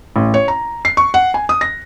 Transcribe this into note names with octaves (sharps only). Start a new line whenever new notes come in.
A1
C#5
A#5
C7
C#6
F#5
G#5
D#6
A#6